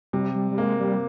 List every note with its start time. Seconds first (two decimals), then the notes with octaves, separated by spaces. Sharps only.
0.13 C3 G3
0.35 G3
0.52 G3
0.58 G#3 A#3
0.80 G3